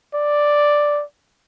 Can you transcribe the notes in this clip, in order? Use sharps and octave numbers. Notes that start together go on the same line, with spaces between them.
D5